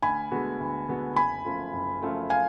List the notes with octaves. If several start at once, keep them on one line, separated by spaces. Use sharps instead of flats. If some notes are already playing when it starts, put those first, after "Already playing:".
D2 G#5 B5
D3 G#3 B3 F#4
D2
D3 G#3 B3 F#4
F#1 G#5 B5
F#2 F3 A3 F4
F#1
F#2 F3 A3 F4
F5 G#5